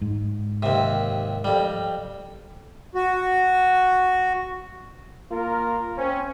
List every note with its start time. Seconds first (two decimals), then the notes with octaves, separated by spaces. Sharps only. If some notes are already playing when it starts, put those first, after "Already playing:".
0.02 G#2
0.63 D#2 C3
1.44 F2 G3
2.95 F#4
5.32 A#3 F4 A#4
5.97 C4 C#4